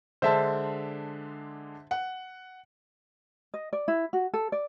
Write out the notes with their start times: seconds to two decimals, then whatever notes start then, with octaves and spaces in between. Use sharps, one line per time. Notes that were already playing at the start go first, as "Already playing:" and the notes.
0.22 D3 G#3 D4 C5 E5 A5
1.91 F#5
3.54 D#5
3.73 D5
3.88 E4
4.13 F#4
4.34 A4
4.52 D5